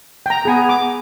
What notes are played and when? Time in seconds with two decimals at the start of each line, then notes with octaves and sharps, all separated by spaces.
0.26 G5 A#5
0.45 B3 G#4 G#5
0.69 D6